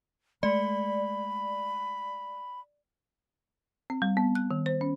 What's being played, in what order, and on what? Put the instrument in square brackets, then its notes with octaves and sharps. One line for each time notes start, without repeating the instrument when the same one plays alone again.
[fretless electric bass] G#3 A3 [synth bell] D5 [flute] B5
[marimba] C4
G3
B3
F#6
D#3
C5
C#4